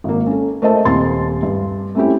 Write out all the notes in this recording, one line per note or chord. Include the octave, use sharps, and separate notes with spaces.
G#1 A#3
C#4 A4
A3 A#4 C5 D#5 E5 A5
D#1 C4 C6 A6
G2
A3 C4 C#4 E4 G4